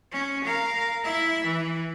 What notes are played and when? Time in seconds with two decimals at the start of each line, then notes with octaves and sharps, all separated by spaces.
0.12 C#4
0.45 A#4 F5
1.04 E4 E5
1.45 E3